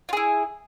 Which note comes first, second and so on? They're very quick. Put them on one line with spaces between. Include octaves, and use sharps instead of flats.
F4 G#4 E4